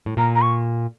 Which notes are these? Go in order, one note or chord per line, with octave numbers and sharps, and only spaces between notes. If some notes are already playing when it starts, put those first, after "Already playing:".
A2
A#2 A#5
A#5
C#6